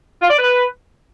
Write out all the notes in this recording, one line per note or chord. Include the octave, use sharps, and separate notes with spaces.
F4
D5
B4